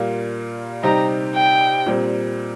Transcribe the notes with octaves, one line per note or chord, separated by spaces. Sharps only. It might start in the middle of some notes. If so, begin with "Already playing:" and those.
Already playing: A#2 G3 A#3 F4
C3 G3 C4 D#4 G4 A#5
G5
A#2 G3 C4